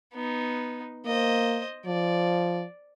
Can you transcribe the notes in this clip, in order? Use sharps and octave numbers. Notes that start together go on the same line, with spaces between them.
B3 D#4
A#3 C5 D#5
F3 D5